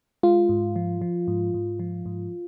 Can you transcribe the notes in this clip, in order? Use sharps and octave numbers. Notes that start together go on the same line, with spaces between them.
G#3 F4
G#2
F3
F3
G#2
G#2
F3
G#2